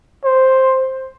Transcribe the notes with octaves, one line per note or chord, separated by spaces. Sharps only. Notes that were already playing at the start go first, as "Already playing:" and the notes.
C5